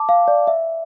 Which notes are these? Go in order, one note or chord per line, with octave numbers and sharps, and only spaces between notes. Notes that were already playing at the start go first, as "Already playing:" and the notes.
Already playing: A5 D6
F5
D5
E5